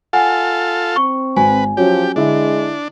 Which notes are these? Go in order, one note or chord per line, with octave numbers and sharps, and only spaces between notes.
F4 A4 F#5 G#5
C4 C#6
G#1 B4 G#5
F3 F#3 C#4 G4
D3 G#3 D4 E4